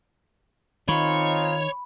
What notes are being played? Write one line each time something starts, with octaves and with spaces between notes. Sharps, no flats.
D#3 C4 D#4 F4 C#5 B5